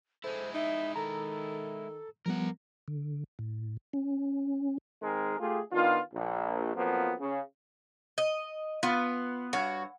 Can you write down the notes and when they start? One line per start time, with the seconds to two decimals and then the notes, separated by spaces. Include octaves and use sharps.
0.24 G#3 E4 A4 C5
0.54 D#4 E5
0.96 D#3 A4 A#5
2.26 F3 G3 B3 A#4 F#5
2.88 D3
3.39 A2
3.93 C#4
5.02 D#3 G#3 C4 G#4 A#4
5.40 A3 F4 G4 G#4
5.72 D#3 B3 D4 F4
6.13 A#1
6.75 F2 F3 F#3 A#3 B3
7.20 C#3
8.18 D#5
8.83 B3 F4
9.53 G2 F#4 C#5 F#5